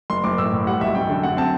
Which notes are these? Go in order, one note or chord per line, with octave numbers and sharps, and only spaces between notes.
F#1 C6
F#1 D6
A2 E6
A2
G3 F#5
B1 E5
F#2 G5
D3
F#2 F#5
C4 A5